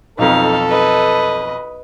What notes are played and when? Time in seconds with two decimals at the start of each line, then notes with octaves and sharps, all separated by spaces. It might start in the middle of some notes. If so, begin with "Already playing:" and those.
0.18 B1 F2 D#4 A4 F5
0.69 B4 D#5